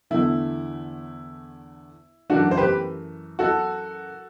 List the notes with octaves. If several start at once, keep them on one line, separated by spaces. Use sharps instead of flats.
E2 D3 A3 E4
F#2 E3 A3 D4 F#4
C5
G4 B4
F#4 A4